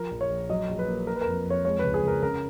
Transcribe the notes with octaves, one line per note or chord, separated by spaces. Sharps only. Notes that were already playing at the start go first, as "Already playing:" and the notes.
Already playing: F3 A#4
A#1
C#5
A#1
F#3 D#5
A#1
B4
A#3
A#3 A#4
B4
F2 A#4
F2 C#5
G#3 C#5
C#2 B4
G#4
C#2 A#4
C#3 A#4